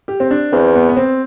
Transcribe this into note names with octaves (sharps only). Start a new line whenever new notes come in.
G4
C4
D4
E2 C4
B3
B3
C4